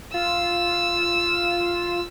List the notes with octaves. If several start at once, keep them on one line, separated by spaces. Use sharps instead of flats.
F4 E6